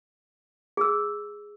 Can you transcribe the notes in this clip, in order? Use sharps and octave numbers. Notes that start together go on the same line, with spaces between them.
G#4 E6